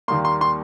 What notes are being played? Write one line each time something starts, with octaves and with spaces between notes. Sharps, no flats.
D#2 D#3 G3 A#3 C6
C6
C6